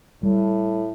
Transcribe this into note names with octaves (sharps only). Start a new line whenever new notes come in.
A2 G3